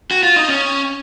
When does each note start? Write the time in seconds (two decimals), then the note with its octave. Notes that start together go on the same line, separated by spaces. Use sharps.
0.11 F#4
0.23 F4
0.36 D#4
0.49 C#4